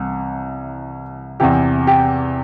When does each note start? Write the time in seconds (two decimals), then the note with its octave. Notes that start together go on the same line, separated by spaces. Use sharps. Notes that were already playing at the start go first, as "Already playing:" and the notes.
Already playing: C2 C3 E3
1.40 E2 C3 E3 G4
1.87 G4